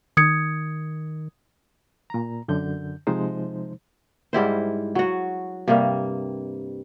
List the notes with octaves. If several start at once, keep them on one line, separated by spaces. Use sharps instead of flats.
D#3 D#6 G#6 C#7
A#2 A#5
F#2 D3 G6
C3 F3 G#3 D#4 C5
G#2 G3 E4 C5
F#3 F#4
G2 C3 G3 A#3